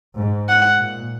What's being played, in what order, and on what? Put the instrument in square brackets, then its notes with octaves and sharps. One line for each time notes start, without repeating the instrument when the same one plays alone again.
[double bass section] G#2
[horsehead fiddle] F#5
[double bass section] A#2